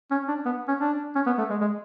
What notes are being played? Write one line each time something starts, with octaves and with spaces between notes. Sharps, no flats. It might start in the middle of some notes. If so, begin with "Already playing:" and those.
C#4
D4
B3
C#4
D4
C#4
B3
A3
G#3
G#3